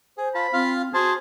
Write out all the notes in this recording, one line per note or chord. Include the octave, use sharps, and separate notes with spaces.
G#4 C5
F4 A5 B5
C4 F4 F5
F#4 G#4 C5 A5